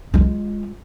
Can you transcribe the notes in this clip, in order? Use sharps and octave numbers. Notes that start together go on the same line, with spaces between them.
G#3 F4